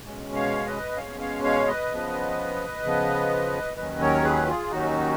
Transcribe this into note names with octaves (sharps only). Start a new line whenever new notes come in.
B2 G#3 C#4
C#5 F5
B4 D#5
B2 G#3 C#4 C#5 F5
C#5 F5
C#5 F5
B4 D#5
C#3 F3 B3
C#3 F3 B3
D#2 D#3 F#3 C#4 B4 D#5
A#4 C#5
G#4 B4
F4 G#4
D#2 D#3 F#3 C#4 D#4 F#4